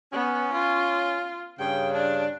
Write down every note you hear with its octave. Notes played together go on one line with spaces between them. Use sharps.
B3 C#4
F4
G2 C#3 G5
D4